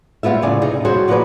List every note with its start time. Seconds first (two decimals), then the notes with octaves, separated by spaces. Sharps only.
0.23 G3 G#3 B3 F4 E5
0.42 F2 A2 C#3 F4 D5 G#5
0.62 C3 D#4 F4 G#4
0.85 G3 F#4 G#4 C5 C#5 A5
1.08 F3 F#3 F#4 G#4 B4 D5